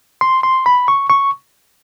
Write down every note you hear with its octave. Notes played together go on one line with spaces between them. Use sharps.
C6
C6
B5
C#6
C#6